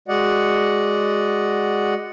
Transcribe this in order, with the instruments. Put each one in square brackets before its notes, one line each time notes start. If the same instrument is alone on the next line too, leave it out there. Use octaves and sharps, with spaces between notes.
[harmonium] G#3 F#4 D5 D#5 F#5